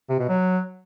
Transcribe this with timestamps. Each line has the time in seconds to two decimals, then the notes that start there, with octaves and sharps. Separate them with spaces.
0.09 C3
0.19 B2
0.29 F#3